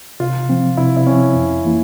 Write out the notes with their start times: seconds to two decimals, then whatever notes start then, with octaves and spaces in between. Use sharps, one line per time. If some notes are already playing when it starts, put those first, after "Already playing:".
0.20 C3 F4
0.49 F3 C4
0.77 C3 E4
0.97 E4
1.06 F3 C4 C#4
1.35 F2
1.64 E3 A#3 E4